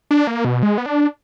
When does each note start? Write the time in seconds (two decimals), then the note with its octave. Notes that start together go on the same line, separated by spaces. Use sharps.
0.11 D4
0.27 A#3
0.45 B2
0.63 G#3
0.78 B3
0.86 D4